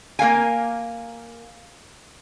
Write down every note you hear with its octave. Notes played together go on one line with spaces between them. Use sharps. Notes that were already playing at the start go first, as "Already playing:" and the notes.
A#3 A#4 F5 G#5